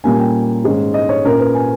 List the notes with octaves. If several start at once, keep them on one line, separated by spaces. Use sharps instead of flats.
A#2 G3 A#3 C#4 G#5
G5
G#2 D#3 G#3 C#4
D#5
C#5
A#2 A#3 C#4 A#4
B4
G#5